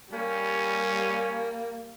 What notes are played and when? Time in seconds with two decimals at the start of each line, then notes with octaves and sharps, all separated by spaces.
0.13 G3 A#3 C#4